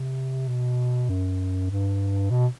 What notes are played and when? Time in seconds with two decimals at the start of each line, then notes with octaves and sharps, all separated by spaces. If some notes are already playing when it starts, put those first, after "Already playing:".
Already playing: C3
0.48 B2
1.09 F#2
1.70 G2
2.31 B2